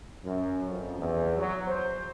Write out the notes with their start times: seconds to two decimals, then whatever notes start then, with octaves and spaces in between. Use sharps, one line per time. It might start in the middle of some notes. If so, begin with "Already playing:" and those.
0.24 F#2
0.68 F2
0.98 E2
1.37 F#3
1.68 C5